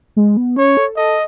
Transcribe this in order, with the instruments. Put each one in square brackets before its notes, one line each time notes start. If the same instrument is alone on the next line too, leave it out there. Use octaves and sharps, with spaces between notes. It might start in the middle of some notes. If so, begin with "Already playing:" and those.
[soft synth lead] G#3
B3
[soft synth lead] C#4 [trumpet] C#5
[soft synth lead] A4
[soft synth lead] A4 [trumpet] D#5